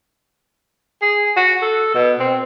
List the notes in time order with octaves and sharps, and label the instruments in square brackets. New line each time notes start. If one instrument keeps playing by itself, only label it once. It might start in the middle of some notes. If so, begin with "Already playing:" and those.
[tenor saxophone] G#4
F#4
A4
B2
C4